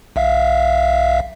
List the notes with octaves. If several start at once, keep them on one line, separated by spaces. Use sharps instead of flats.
B1 E5 F5